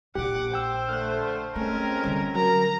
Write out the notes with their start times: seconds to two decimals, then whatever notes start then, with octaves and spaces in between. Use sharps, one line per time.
0.15 A#1 D4 G4 F#5 D6
0.54 C5 G5 E6
0.89 D3 A3 F6 F#6
1.56 F2 G#3 A3 C4 C#4 A#4
2.04 D3 G3
2.35 F#3 A#4 A#5